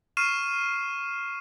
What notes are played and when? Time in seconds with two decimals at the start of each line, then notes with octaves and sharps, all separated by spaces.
0.17 C#6 F6 C7 D#7 E7